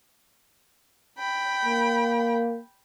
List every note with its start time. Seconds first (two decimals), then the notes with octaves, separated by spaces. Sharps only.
1.18 G5 B5
1.65 A#3